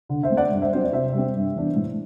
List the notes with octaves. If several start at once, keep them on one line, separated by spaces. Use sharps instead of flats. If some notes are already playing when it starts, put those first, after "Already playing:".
D3
C5 E5
A3 C4
D5 F#5
G2
C5 E5
F#3 C4 C5
D5
C3 C5 E5
G3 C4
G2
E3 B3 D4
A2